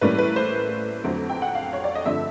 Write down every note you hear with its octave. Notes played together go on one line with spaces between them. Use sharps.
A2 E3 G3 A#3 C#4 B4
B4
C5
F2 D3 F#3 A3 C4
G5
F#5
F5
C#5
D5
D#5
G2 D3 F3 A3 C4 E5